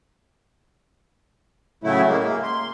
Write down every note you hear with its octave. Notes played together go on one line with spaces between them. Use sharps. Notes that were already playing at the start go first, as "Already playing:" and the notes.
A2 C#3 F#3 A3 E4
G#3 A#3
A#3
C6